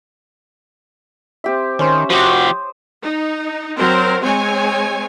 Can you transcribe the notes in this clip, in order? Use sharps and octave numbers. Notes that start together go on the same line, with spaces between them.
C4 G4 E5
D#3 C#4 C5
F3 F#4 G4 C6 D#6
D#4
F#3 C4 A#4 C5
G#3 C4 C#5 G#5